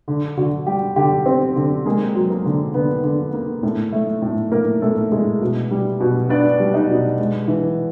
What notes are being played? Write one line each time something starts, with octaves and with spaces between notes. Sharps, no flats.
D3
D3 F#4
G3 G4
D3 G4
C4
D3
G#3 A#3 G#4
F#3
A#3 A#4
D3
D3 B3 B4
D3
A#3
A2
A3
A2
A2 A#3 A#4
A2 A3 A4
A2 G#3 G#4
B2
G3
B2
B3 D4 D5
G3
D#4 D#5
B2
G#3
E3